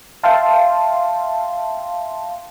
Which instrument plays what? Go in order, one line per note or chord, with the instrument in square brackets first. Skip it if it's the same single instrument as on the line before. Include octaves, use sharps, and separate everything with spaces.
[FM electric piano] E5 F5 G5 A5 C6